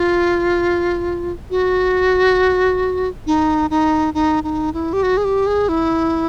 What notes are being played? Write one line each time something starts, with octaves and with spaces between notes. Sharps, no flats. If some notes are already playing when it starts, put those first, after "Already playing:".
Already playing: F4
F#4
D#4
D#4
D#4
D#4
E4
G4
F#4
G#4
G4
G#4
E4